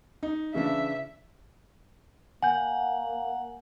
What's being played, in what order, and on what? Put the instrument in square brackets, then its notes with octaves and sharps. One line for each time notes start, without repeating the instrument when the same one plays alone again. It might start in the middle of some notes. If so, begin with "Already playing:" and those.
[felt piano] D#4
[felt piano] C#3 E3 D4 [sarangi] E5
[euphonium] A#3 [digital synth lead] F#5 [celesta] G#5 G6